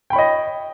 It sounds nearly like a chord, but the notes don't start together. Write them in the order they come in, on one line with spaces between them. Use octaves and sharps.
G5 B5 C#5 D#5